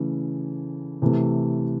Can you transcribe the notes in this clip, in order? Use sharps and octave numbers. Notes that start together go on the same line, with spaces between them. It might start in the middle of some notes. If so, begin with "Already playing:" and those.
Already playing: C#3 E3 A3
C3 E3 A3